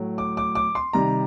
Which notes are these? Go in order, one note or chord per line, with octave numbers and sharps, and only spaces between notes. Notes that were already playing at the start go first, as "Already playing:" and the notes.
Already playing: A2 F#3 A3
D6
D6
D6
C6
C3 D#3 G3 A#5